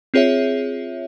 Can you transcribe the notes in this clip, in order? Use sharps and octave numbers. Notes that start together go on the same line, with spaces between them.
C4 F4 G#4 C#5 E5